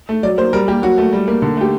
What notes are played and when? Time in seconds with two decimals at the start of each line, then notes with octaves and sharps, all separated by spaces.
0.09 A3
0.23 F#3 D5
0.38 A#3 C5
0.53 G3 A#4
0.68 A#3 G4
0.83 F#3 F#4
0.98 A3
1.13 G3
1.28 A#3
1.42 D3
1.57 A3 G4